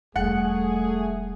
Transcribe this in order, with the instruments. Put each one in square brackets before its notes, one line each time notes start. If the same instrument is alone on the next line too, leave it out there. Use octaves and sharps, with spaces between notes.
[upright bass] E1 G3 [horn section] A3 G#4 [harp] F#5